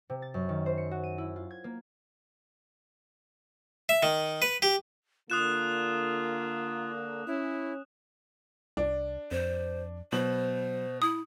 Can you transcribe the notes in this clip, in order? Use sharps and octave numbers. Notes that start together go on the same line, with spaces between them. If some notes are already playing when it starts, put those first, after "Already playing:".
C3
A6
F#2
D#3
C5
C#7
F#4
D#7
E4
F4
G#6
A#3
E5
D#3
B4
G4
D3 A#3 F4 D#6 F#6 E7
C#4 E4
C2 D4
F2 C5
B2 F#3 C5 F#7
E4 D#6